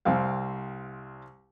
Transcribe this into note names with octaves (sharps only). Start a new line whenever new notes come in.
C2 C4 F5